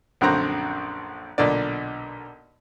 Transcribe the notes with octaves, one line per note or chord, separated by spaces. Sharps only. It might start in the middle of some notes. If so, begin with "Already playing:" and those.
A#1 F#2 D3 C4 A#5 F#6
B1 A#2 D3 D5